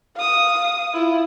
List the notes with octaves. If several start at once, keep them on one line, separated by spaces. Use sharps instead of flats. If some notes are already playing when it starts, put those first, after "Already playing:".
F5 D#6
E4 F4